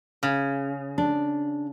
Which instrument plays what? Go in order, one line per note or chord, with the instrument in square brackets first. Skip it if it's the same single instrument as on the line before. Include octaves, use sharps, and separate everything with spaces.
[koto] C#3
[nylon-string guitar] D4